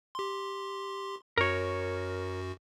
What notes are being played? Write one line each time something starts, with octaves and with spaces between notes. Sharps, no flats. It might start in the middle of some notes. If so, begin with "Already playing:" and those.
G4 C6
F#2 F#4 A#4 C#5